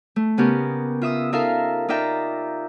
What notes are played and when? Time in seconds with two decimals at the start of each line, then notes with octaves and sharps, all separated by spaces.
0.16 A3
0.37 C#3 B3 C#4 G4 A#4
1.02 F4 E5 D#6 E6
1.32 D#4 F4 A4 A#4 E5 F5
1.88 D#4 F4 D5 E5 G5 A#5